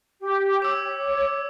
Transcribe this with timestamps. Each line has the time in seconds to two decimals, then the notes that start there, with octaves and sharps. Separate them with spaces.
0.21 G4
0.62 C#5 D6 E6